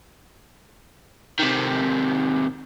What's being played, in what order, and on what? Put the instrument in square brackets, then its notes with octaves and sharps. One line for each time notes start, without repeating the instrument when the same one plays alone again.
[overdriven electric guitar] C3 D#3